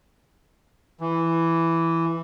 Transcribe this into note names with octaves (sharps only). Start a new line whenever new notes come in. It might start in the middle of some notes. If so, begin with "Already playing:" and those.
E3